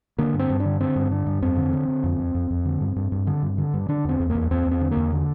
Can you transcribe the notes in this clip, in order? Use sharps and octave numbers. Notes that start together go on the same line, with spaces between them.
D3 A#3
G2
C4
G2
D4
D3
D3 C4
G2
D3 D4
G2
F2 C4
D3
D3
D3
F2
F2
F2
F2
D3
G2
G2
G2
D3
G2
D3
G2
D3 D4
E2 C4
E2
A#3
E2
E2 C4
E2
C4
D3
A#3
E2
D3